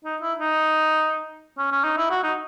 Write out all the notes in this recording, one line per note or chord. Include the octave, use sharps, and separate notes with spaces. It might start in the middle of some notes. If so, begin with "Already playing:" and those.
D#4
E4
D#4
C#4
C#4
D#4
E4
F#4
D#4